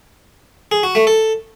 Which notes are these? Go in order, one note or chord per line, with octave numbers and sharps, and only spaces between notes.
G#4
F#4
A3
A4